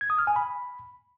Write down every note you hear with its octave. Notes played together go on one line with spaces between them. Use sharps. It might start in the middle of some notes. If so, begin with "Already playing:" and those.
G#6
D#6
F6
G#5
B5